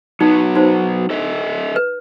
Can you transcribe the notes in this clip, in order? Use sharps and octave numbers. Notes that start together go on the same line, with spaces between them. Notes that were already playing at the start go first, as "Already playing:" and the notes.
F#3 B3 D#4
D#4 F#4 C5
A4 D#5 E5
B4